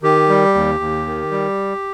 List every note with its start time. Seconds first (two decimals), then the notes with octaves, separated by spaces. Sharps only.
0.03 D#3 G4
0.29 G3
0.55 D#2
0.80 D#2
1.06 D#3
1.31 G3